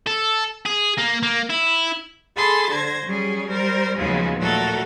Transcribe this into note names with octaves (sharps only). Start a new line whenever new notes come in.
A4
G#4
A#3
A#3
E4
G#4 A4 A5 B5 C6
D3 C5 G#6 A#6
F#3 G3 C#4 G#4
G3 A#4 C5
D#2 C#3 F3 F#3 G#3 B3
A#2 F#3 A3 F#4 A4 A#4